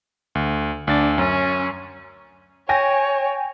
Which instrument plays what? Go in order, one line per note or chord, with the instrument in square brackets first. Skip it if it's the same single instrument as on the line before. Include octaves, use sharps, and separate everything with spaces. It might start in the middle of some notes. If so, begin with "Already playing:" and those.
[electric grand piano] D2
[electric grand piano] D2 A6 [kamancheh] D4
[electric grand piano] F#2 [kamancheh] C#4
[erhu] C#5 [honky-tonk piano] G5 G#5 A#6